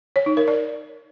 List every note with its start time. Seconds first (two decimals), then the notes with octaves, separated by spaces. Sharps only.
0.16 C#5
0.26 D#4
0.37 A#4
0.48 D5